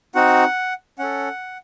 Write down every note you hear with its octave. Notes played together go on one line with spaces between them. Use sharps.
C4 D#4 F#4 F#5
C#4 A4 F#5